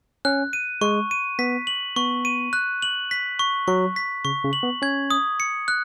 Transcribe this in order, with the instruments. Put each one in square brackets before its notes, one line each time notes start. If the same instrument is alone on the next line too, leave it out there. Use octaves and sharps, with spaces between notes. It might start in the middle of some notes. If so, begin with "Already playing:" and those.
[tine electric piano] C#4 [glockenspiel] F#6
[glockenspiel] D#7
[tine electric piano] G#3 [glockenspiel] C#6
[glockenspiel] D#7
[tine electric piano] B3 [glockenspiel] B6
[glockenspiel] F#7
[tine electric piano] B3 [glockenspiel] C#6
[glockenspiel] D#7
F#6
F#7
B6
C#6
[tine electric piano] F#3 [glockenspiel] C#6
[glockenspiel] B6
[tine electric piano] C#3 [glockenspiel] C#6
[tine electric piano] C#3
[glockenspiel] F#7
[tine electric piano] B3
[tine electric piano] C#4 [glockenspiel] G#6
[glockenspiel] D#6
C#7
F#6